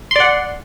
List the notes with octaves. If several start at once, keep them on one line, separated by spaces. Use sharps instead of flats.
D5 F#5 C6